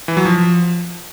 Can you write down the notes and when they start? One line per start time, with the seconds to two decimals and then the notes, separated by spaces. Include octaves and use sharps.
0.08 E3
0.17 F#3
0.25 F3